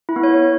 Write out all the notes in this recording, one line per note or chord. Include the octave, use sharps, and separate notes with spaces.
E4
B3
C#5